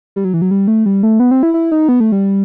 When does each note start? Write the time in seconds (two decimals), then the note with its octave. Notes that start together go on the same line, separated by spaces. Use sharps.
0.16 G3
0.25 F#3
0.34 E3
0.42 F#3
0.51 G3
0.68 A3
0.86 G3
1.03 A3
1.20 B3
1.31 C4
1.43 E4
1.54 E4
1.72 D#4
1.89 B3
2.00 A3
2.12 G3